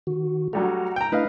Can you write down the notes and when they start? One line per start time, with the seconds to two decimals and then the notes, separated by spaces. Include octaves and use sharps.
0.07 D#3 F#4
0.53 F#3 G3 A3 F#5 A#5
0.96 G5 A#5
1.12 A3 D4 E4 B4 D#5 F5